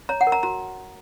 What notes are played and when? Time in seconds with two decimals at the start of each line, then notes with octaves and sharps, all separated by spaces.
0.09 C#5 A#5
0.21 F#5
0.27 A#4
0.32 A#5
0.43 F#4 A#5